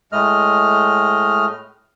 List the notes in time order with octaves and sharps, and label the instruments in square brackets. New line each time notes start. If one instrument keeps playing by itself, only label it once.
[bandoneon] A2 G#3 A3 D#5 F6